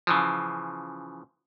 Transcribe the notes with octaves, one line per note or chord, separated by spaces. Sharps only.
C#3 E3 F3